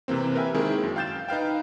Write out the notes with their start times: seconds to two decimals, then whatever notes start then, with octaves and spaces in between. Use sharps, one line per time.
0.08 C3 E3 A#3 C4
0.35 A#4 B4 E5 G5 G#5
0.54 D#3 G#3 A#3 C4 E4 G#4
0.83 F#2
0.96 F5 G5 G6 A6 E7
1.28 D#4 B4 F5 G5